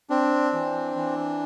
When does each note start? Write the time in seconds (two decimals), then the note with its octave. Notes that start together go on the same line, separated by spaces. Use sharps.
0.10 C4 D4
0.53 E3
0.96 E3